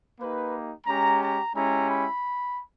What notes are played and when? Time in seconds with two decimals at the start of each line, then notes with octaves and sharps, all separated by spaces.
0.20 A#3 D#4 G4 B4
0.86 G#3 C#4 G4 A#5
1.21 A#5
1.54 G#3 C#4 E4 G4 A#5
1.88 B5